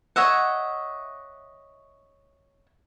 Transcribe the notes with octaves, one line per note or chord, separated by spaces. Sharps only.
C#5 D#5 E5 F#5